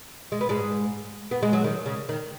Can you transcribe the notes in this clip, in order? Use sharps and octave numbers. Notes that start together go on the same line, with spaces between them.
G#3
B3
G#2 G#3
B3
G#3
F#3
D#3
C#3
D#3